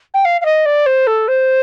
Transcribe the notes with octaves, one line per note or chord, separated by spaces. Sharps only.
G5
F5
F5
D#5
D5
C5
A4
C5